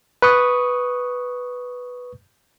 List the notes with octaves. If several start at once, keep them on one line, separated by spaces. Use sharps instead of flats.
B4 C#6 D#6